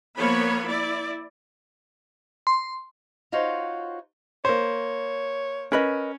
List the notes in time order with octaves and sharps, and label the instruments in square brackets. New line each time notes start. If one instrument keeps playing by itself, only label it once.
[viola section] F3 A#3 B3 C#5 B5
E4 D5
[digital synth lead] C6
[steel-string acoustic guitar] D#4 F4 F#4 C5 C#5
[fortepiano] A#3 C5 [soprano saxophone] C#5
[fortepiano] C#4 [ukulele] A#4 B4 D#5